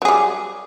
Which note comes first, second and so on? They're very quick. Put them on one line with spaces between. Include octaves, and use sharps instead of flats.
F#3 G#4 G3